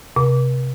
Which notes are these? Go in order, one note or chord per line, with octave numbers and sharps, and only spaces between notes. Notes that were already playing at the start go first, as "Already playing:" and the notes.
C3